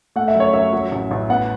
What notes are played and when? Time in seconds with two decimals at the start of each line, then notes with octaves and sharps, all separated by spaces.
0.16 A3 F#5
0.28 E5
0.35 F#2
0.40 C#5
0.53 F#2 E5
0.73 F#3
0.92 A1
1.11 A1
1.30 B3 F#5